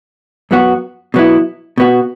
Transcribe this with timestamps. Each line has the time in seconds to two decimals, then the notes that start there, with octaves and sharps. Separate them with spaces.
0.51 F#2 F#3 B3 F#4
1.14 B2 F#3 B3 E4
1.78 B2 B3 F#4